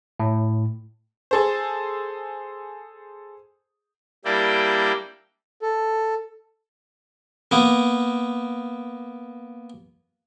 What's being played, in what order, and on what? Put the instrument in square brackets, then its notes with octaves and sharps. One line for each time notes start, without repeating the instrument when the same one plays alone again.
[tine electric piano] A2
[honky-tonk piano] G#4 A4 C5
[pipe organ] G3 A#3 D4 E4 D5 G5
[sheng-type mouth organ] A4
[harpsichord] A#3 B3